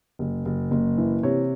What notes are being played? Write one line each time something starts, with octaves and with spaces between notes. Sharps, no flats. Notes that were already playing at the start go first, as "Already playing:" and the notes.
F#1
F#1
F#1
E3
C3 C#5